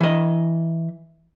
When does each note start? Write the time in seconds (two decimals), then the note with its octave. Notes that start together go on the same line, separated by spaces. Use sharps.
0.01 E3 D#5